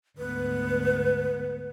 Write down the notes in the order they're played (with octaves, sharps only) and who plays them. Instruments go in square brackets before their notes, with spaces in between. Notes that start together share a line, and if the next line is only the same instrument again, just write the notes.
[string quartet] D2 G#2 B3 [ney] B4